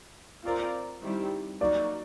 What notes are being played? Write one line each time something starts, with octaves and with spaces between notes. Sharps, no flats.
C4 F4 A#4 D5
D#3 G3 C4 E4 G4
F#3 A#3 D#4 F#4 D5